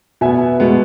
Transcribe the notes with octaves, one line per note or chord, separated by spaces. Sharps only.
B2 B3 E5 G#5
B2 G#3 B3